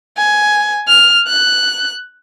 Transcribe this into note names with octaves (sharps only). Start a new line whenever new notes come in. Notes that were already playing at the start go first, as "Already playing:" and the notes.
G#5
F6
F#6